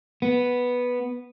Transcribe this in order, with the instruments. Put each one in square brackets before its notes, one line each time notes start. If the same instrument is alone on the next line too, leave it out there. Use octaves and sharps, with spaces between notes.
[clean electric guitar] B3